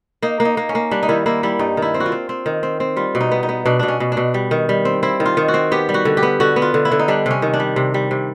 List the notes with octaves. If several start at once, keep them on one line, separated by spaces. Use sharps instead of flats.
A#3 D#4
A#3
D#4
A#3
C#4
A#3
G3 D4
D#4
D#3 E4
A#3 E4
G3 E4
G2 D#4
D#3
E4
C4
F#4
F4
C4
C4
D#3
C4
C4
G3 F4
B2
D#4
B3
D#4
B3
B2 D4
B2 D4
C#4
B2
D4
B2
G3
D#3
G3
C4
C4 E4
D#3
F4
D#3
F#4
C4
B3 G4
G3
F#4
D3
G4
B3
D3 F#4
B3
F4
D3
E4
D3
D#4
G3 D4
C3 C#4
D#3
D4
G3
C3
G3
C3